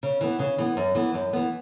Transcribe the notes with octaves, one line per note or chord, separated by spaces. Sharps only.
C#3
E3 B3
C#3
E3 B3
F#2
E3 B3
F#2
E3 B3